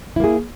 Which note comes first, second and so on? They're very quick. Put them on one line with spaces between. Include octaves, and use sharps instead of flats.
E4 A#3 G#4